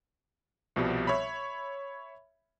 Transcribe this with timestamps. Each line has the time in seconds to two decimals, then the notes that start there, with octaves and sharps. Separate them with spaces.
0.76 C2 B2 F3 G3
1.07 C#5 E5 B5